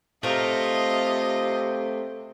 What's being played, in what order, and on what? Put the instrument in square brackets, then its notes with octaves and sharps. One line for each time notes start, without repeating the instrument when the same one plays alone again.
[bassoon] C3 [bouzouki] A3 A#4 [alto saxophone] C4 [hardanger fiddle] F4 D#5